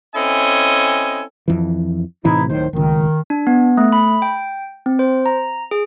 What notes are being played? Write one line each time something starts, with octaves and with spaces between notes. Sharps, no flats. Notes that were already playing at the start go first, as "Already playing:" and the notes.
C4 C#4 E4 A4 D#5 G#5
F2 E3
A2 C3 E3 D#4 E4
D1 A2 D#3 C5
D1 C#2 D#3
D4
B3
A3
B5
G5
C4
C5
A#5
G#4